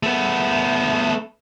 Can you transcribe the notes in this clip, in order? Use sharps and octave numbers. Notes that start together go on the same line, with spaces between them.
A3 B3